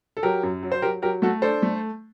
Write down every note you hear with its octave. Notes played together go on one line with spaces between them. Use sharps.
A4
F#3 G4 A#4
F#2
F#3
C5
F#3 G4 A#4
F#3 G4 A#4
A3 F#4 A4
D4 A4 C5
A3